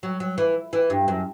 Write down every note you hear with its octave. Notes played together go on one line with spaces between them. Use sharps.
F#3
F#3
E3
E3
G2
F#2